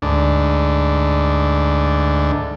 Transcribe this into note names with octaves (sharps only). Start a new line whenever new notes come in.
D2 G#2 D4